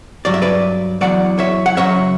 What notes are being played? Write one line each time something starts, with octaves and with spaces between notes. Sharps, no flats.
G2 F#3 D5
E5
B4 D5
E2 C#3 F#3 D5 F#5
C#5 E5
F#5
F#2 C#3 F#3 C#5 E5